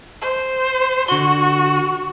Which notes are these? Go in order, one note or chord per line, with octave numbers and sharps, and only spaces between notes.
C5
D3 F#4 C6